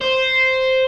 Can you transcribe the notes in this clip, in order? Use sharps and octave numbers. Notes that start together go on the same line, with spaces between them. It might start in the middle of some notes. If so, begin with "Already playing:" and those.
C5